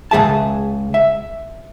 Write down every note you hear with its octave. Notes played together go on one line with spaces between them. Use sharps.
C#2 D#3 G#4 E5 A5
E5